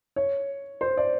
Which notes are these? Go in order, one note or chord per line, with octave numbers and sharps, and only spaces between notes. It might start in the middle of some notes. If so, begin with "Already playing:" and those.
C#5
C5
D5